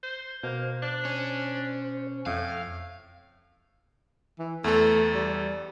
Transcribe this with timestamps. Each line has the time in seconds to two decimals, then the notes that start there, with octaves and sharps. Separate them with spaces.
0.03 C5
0.43 B2 A#3 C5
0.83 D4
1.05 C#4
2.26 F2 A2 F5
4.39 E3
4.64 E2 A3 A4
5.14 G3